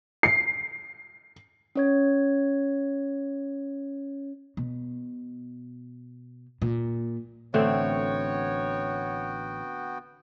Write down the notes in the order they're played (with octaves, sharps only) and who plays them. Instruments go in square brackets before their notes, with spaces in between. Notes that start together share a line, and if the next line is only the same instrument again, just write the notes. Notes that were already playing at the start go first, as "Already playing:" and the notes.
[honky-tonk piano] C7
[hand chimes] C#4 C#5 G#6
[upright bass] B2
A#2
[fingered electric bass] A1 [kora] D3 A3 C4 [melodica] B3 F#4 G5 [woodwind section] C#5